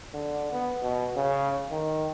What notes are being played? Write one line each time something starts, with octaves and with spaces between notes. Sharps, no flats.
D3
B3
B2
C#3
D#3